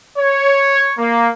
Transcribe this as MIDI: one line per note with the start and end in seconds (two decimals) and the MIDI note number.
0.18 0.92 73
0.99 1.30 58